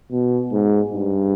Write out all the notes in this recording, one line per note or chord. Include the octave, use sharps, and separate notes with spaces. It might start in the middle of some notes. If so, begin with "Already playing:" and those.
B2
G#2
G2